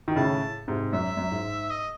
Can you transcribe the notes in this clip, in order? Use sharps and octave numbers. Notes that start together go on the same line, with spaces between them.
D#3
A2 C#3 A5
G#2 C3
F#2 E5
F#2
G#2
D#5